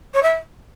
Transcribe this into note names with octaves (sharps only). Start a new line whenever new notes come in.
C#5
E5